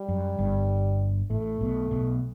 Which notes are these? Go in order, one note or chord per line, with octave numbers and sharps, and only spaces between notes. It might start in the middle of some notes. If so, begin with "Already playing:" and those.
Already playing: G3
F#2
G1 G2
A1 A2 A3
B1 B2
B1 B2